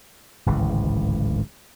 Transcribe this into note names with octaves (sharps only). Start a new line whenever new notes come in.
D1 G#1 C#2 E3